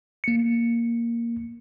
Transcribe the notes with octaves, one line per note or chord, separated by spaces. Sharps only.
A#3 C#7